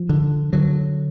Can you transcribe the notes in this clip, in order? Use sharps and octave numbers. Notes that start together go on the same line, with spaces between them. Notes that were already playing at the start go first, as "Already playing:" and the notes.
Already playing: F3
D3
D3 F#3